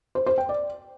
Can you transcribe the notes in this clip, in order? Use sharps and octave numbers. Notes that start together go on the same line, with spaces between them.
C5
C5
G5
D5